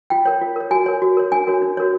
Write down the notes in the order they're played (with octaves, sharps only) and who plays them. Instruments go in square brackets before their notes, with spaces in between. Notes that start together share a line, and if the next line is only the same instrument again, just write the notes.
[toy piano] F4 G5
A#4 C#5
F4
A#4 C#5
F#4 G#5
A#4 C#5
F#4
A#4 C#5
D4 G#5
F#4 A#4 C#5
D4
F#4 A#4 C#5